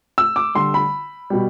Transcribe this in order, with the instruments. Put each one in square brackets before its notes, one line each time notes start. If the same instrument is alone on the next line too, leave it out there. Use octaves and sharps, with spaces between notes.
[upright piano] E6
D6
D3 G3 C6
B5
B2 G3